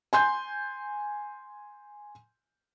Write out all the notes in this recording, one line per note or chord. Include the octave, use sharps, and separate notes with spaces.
G#5 C6 G6